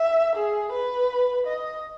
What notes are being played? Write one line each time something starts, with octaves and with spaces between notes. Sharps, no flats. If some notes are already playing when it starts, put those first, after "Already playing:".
Already playing: E5
G#4
B4
D#5